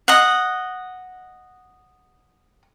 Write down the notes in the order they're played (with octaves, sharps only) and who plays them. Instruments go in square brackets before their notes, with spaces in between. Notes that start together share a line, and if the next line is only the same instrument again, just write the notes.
[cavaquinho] D#5 F#5